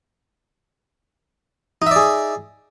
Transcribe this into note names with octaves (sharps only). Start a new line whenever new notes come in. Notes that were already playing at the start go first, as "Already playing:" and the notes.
D#4 G#4 D5 E5